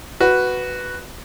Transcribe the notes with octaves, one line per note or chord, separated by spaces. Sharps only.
F#4 B4